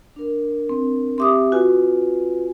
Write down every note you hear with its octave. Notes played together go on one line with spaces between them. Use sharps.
D4 A#4
C4
C4 G4 E5 C6 D6 D#6
F4 F#4 B4 G#5